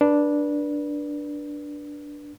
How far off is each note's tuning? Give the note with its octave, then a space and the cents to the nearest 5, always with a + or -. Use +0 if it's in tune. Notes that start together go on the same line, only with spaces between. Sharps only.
D4 +0 B4 -25